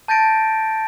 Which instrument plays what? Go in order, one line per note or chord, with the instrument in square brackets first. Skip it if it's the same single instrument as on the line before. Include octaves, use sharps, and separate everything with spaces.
[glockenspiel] A5 G6 A6 A#6 D7